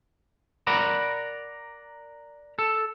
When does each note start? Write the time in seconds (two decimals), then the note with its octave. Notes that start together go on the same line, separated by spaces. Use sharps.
0.67 A#4 D5 F#5 A#5 B5
2.59 A4